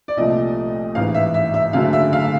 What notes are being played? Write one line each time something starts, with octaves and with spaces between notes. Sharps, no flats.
D5
C2 A#2 F3 A3 D#5
A1 G#2 E3 F5
E5
E5
E5
F#1 F#2 D3 F#3 A3 F5
E5
F5